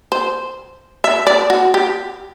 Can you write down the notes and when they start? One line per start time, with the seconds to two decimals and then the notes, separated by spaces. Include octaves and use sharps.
0.12 C5
1.04 E5
1.27 D5
1.50 F#4
1.74 G4